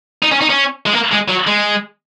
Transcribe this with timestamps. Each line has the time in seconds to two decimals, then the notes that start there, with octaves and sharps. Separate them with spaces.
0.22 D#4
0.31 C#4
0.41 D#4
0.50 C#4
0.86 G#3
0.93 A#3
1.12 G#3
1.28 F#3
1.47 G#3